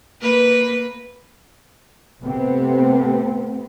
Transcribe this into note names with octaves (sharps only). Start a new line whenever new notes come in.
A#3 B4
C3 A3 B3 C4